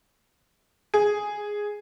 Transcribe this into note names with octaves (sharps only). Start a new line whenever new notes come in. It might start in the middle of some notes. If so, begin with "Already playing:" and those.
G#4